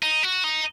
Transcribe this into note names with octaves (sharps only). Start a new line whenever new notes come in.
D#4
F#4
D#4